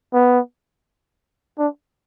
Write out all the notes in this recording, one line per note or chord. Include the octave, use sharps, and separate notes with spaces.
B3
D4